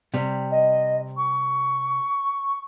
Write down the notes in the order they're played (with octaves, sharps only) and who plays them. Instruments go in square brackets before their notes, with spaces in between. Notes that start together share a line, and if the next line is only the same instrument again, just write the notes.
[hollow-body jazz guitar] C3 G3
[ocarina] D#5
C#6